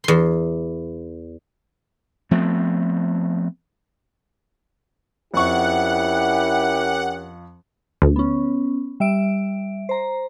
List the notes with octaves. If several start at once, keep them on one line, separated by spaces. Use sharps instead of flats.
E2 C6
F3 A3 B3 C4
F2 C#4 E4 G4 A#4 F#5 C#6
D2
B3 C#4
G3 E5 D7
C5 A#5